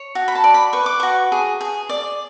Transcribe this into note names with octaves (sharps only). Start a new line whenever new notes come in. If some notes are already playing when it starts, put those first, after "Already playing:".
Already playing: C#5
F#4
B5
A5
D5
B5
B4 C#6
D6
F#4 C#6
G#4
G#4
D5